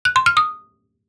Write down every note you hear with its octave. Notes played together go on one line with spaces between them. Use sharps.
F#6
C6
F6
D#6